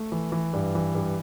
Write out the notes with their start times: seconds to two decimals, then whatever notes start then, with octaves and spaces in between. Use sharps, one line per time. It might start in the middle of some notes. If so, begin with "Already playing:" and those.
Already playing: A3
0.12 E3
0.32 E3
0.53 G2
0.75 E3
0.95 G2